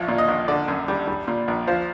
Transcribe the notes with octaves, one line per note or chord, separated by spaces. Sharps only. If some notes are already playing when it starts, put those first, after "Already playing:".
Already playing: A1 F3
A#2
D#5
A#1
D3 D5
F#2
G3
G3
A#2
A#1
F3 C5